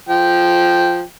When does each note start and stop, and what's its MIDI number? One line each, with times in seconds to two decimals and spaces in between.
0.09 1.03 53
0.09 1.03 79